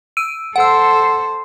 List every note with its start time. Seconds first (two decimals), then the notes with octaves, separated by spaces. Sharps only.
0.17 E6 D7 D#7
0.56 A4 C5 F#5 E6